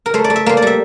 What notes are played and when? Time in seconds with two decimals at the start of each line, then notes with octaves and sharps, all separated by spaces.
0.06 A#4
0.14 A3 C5
0.24 D5
0.30 A3
0.36 E5
0.46 A#3 C5
0.57 D5
0.62 G3 E5